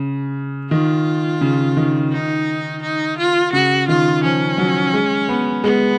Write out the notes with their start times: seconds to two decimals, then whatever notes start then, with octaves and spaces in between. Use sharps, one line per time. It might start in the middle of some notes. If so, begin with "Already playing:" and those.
Already playing: C#3
0.71 D#3 F4
1.41 C#3
1.77 D#3
2.12 D#4
2.82 D#4
3.18 F4
3.52 C#3 F#4
3.88 D#3 F4
4.24 F3 C#4
4.58 F#3
4.94 G#3
5.29 B3
5.64 G#3 B3